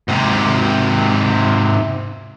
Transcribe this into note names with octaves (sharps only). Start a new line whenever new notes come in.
G#2 C3